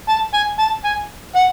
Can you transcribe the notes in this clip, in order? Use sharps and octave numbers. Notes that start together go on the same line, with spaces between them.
A5
G#5
A5
G#5
F#5